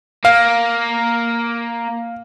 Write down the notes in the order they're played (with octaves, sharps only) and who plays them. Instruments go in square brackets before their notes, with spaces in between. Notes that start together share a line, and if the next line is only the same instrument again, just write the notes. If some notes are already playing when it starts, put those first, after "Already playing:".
[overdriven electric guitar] A#3 [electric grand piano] F5